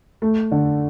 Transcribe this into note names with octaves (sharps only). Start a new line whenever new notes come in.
A3
D3